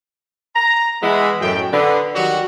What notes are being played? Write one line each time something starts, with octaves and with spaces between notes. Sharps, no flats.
A#5
E3 G#3 B3 E4 G#4 B5
F#2 A2 G5
D3 B3
D#3 F#3 G3 F#4